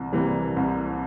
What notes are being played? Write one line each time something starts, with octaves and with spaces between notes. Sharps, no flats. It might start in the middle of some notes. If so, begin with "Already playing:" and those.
Already playing: C2 E3
C3 E3 G3 A#3
C2